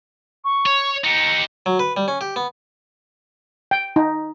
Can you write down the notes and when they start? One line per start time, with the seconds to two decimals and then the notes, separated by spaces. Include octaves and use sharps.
0.44 C#6
0.66 C#5
1.04 D#4 G4 C#7
1.66 F#3
1.79 B4
1.97 G3
2.08 C#4
2.21 G4
2.36 B3
3.71 G5
3.96 D#4